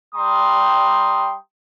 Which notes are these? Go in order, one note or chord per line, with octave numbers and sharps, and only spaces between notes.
G3 G5 A#5 C6 D#6